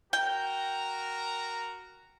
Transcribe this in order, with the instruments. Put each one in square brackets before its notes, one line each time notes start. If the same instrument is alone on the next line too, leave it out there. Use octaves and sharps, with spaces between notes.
[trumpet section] F#4 A#4 A#5 [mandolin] G5